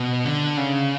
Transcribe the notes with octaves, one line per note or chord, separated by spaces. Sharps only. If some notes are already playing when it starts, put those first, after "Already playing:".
Already playing: B2
D3
C#3